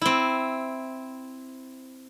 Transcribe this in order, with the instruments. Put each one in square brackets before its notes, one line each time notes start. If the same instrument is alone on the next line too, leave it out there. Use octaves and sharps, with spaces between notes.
[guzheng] C4 E4